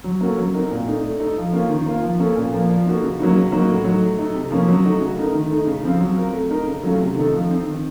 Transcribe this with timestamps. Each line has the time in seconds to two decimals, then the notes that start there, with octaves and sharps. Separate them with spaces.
0.04 F#3
0.21 A#3 C#4 F#4 A4
0.38 F#3
0.54 C4 D#4 A#4
0.71 A#2
0.87 A3 D#4
1.04 A3
1.20 D#4 A4
1.37 F3
1.53 A#3 C#4 F4
1.70 D#3
1.86 A#3 F4
2.02 F3
2.19 A#3 C#4 A4
2.37 A#2
2.52 F3 A#3
2.70 F3
2.86 A#3 D#4 F#4 A4
3.03 C#3
3.19 F#3 A#3 D#4 F#4
3.36 C#3
3.52 F#3 A#3 D#4 F#4
3.69 A2
3.84 F#3 A3 D#4
4.01 A3
4.19 D#4 A4
4.34 C3
4.51 F3 A#3 C#4
4.68 F#3
4.85 A3 D#4 F#4
5.00 C#3
5.17 A3 D#4 A#4
5.35 D#3
5.51 A3 D#4
5.67 C#3
5.83 F3 C4
6.00 F#3
6.16 C4 F4 A#4
6.33 A3
6.50 D#4 A#4
6.67 C#3
6.83 F#3 A3 C#4 F4
7.00 C3
7.16 D#3 A3 D#4 A4
7.32 F3
7.49 C4 D#4
7.66 D#3